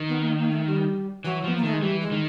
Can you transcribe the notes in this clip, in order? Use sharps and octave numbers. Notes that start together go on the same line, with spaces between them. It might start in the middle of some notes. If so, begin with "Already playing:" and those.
Already playing: D#3
B3
A#3
A#3
A3
G3
E3 F#3
F3 B3
A#3
D#3 A3
G#3
E3 G3
G#3
D#3